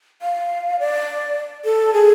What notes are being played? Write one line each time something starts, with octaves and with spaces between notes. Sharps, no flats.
F5
D5
A4
G#4